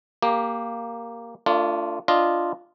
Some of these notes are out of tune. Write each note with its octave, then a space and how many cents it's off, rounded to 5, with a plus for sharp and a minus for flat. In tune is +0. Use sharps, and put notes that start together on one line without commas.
A#3 +0 G4 +10
A3 +40 D4 +0 F4 -5
D4 +0 F4 -5 D#5 +0